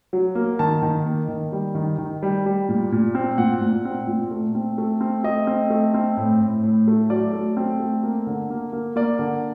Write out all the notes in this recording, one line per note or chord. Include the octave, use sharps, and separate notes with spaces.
F#3
A#3
D#3 A5
D#3
A#3
D#3
G3
D#3
D#3
G3
G3
A#2
A#2
C4
A#2 F#5
A#2
C4
A#2
A3
C4
A3
C4
A3 D#5
C4
A3
C4
A2
A2
A2
A3
F#3 D5
A3
C4
A3
A#3
D3
A#3
A#3
A#3 D5
D3